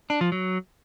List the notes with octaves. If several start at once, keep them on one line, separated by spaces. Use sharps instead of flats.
D4
F3
F#3